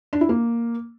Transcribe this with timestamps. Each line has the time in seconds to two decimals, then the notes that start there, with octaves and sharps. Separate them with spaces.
0.13 D4
0.21 E4
0.29 A#3